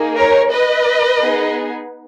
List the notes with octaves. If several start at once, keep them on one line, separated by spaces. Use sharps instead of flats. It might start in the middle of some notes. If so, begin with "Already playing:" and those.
Already playing: A#3 D#4 G#4
A#4 C#5
B4 D#5
B3 D#4 G#4